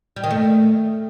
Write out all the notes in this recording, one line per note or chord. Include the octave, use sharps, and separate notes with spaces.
G3
D#3
A3